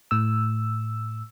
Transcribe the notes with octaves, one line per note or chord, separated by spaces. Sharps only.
A2 E6